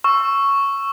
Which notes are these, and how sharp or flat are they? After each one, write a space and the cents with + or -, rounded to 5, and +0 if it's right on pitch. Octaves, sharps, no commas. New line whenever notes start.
C#6 +0 E6 +15